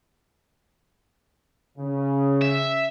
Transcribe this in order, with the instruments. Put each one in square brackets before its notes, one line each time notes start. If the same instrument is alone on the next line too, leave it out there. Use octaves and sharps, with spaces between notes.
[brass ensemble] C#3
[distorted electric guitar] E5